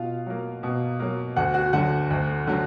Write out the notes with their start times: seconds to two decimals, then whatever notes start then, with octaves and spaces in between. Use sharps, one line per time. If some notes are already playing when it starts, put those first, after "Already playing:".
Already playing: B2 F4 F5
0.26 F#3 A#3
0.63 B2
1.00 F#3 A#3
1.36 D2 F#4 F#5
1.54 F#4 F#5
1.73 D3 F#3 F#4 F#5
2.10 D2
2.47 D3 F#3